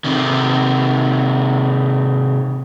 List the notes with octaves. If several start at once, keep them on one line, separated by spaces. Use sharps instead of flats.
C3 D#3